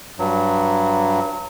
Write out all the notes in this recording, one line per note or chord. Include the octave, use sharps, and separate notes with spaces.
G2 F#3